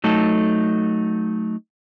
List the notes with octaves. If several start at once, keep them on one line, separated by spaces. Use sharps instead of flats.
F#3 A3 D#4 A4